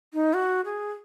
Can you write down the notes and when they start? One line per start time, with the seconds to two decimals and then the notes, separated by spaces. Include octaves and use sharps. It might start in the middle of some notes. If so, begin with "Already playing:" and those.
0.14 D#4
0.34 F#4
0.65 G#4